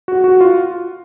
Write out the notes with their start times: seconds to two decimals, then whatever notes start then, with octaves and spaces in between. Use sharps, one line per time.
0.08 F#4
0.24 F#4
0.41 F4